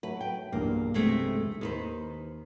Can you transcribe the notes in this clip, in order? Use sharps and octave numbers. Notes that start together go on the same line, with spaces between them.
F#3 A3 B4
G5
B1 E2 G2 A#3
C3 G#3 A3
D#2 D#3 B4 C5